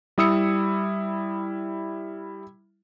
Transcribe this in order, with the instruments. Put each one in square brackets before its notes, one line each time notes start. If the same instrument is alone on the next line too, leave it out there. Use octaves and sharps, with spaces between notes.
[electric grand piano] G3 E4 D#6 E6 C#7